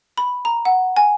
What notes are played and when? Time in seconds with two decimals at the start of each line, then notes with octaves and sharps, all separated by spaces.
0.18 B5
0.45 A#5
0.65 F#5
0.97 G#5